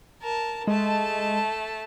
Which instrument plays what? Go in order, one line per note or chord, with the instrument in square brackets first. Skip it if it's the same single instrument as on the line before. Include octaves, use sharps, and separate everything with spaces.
[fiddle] A#4 A5
[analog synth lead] G#3 [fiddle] A3 A5